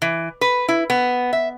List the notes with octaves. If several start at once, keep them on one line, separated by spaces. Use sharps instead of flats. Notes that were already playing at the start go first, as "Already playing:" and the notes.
E3
B4
E4
B3
E5